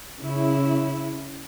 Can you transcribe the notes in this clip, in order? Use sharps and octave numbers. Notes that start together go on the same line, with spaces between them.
C#3 E4